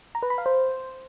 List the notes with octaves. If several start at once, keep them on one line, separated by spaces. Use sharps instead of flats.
A#5
B4
B5
F5
C5